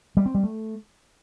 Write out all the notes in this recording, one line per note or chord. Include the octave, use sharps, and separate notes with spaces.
G3
C4
G3
A3